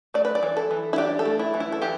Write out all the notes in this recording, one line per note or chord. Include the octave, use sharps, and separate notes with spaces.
A3 D5
B4
D5
E3
A4
E3
E4
D4 G4
A4
A3
E4
E3
E4
A4
E3 G4